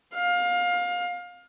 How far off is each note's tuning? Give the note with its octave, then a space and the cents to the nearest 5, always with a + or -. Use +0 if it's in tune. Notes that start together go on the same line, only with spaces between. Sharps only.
F5 +25